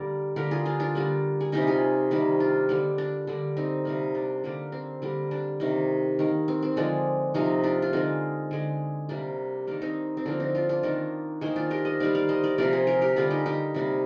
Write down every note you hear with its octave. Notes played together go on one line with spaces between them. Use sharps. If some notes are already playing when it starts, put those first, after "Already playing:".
Already playing: D3 G3 A#3 A#4 D5
D3 G3 A#3 G4 A#4
F4 G#4
D4 F4
D4 F4
D3 G3 A#3
G#4
C3 G3 A#3 D#4 G4
F4 G#4
C3 D#3 G3 A#3
D4 F4
D3 G3 A#3
D4
D3 G3 A#3
C4 D#4
C3 G3 A#3
D4
D3 G3 A#3
C4
D3 G3 A#3
D4
C3 D#3 A#3
D#3 A#3
C4
C4
D3 F3 G#3 D4
C3 F3 A#3 C4 D#4
D4 F4
F4
D3 G#3 C4 D#4
D3 G#3
C3 G3 A#3 D4
D#3 A#3 D4
C4 D#4
C4
D3 F3 A#3 D4
C4 D#4
D4 F4
D4 F4
D#3 A#3 D4
D#3 A#3 G#4 C5
D4 F4
G4 A#4
C5 D#5
D#3 G3 A#3 D5 F5
D5 F5
C5 D#5
A#4 D5
C3 F3 A#3 A#4 D5
G#4 C5
G4 A#4
G4 A#4
D3 G3 A#3 F4 G#4
D#4 G4
D#4 G4
C3 G3 A#3